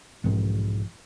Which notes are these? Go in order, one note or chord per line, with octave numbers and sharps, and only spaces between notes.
B1 G#2 E3 F3